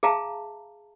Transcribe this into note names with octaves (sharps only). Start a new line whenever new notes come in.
G#4 E5 F5 A5 A#5